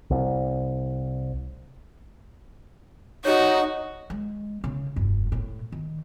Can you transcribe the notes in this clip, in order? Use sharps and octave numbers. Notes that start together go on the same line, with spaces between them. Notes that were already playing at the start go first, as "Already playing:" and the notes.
C2
D#4 F#4 C#5
G#3
C#3
F1 G2
A2
D#3